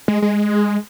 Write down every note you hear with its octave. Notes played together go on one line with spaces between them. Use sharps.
G#3
G#3